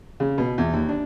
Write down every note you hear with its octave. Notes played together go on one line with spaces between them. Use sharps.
C#3
B2
E2
D#2
D4